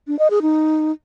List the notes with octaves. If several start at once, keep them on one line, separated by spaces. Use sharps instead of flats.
D4
D#5
G#4
D#4